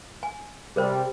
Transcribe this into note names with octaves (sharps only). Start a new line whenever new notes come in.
G#5
C3 G3 G#4 A#4 C5